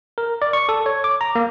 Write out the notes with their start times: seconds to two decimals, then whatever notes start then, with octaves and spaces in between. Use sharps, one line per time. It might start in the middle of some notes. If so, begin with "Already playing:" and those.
0.18 A#4
0.42 D5
0.53 C#6
0.69 A4
0.86 C#5
1.04 D6
1.21 A#5
1.35 A#3